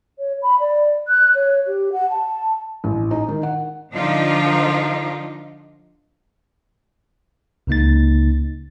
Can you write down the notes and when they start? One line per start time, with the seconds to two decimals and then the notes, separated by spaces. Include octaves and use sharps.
0.19 C#5
0.42 B5
0.60 D5
1.08 F#6
1.35 C#5
1.67 G4
1.93 F#5
2.10 A5
2.84 A1
3.11 D#4
3.29 D#3
3.43 F#5
3.94 D3 F3 D4 D#4 F4 A#4
7.67 C#2 C#3 A#3 D#4 A6